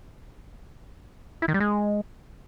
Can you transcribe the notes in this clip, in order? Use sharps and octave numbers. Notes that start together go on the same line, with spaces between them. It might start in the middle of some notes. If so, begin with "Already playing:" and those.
E4
D#3
G3
G#3